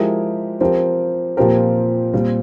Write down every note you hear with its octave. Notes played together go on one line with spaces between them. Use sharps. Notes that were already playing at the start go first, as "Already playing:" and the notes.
Already playing: F3 G#3 E4 G4 A#4
F3 C4 G4 A#4
A#2 F3 C4 G4 A#4
A#2 G3 C4